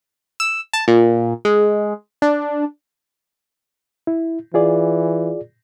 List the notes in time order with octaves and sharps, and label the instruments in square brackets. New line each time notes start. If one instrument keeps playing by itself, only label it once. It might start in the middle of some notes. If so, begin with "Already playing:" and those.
[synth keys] E6
A5
A#2
G#3
D4
[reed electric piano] E4
[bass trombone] E3 [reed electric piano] F4 G#4 D5